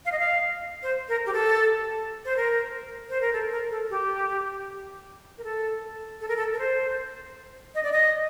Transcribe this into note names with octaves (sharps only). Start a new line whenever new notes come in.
F5
D#5
F5
C5
A#4
G4
A4
C5
A#4
C5
A#4
A4
A#4
A4
G4
A#4
A4
A4
A#4
A4
A#4
C5
D#5
D5
D#5